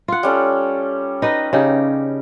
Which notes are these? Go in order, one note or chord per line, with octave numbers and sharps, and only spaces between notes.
F4 F#5
G3 C#4 A4
D#4 B4 D#5
C#3 D#4 G4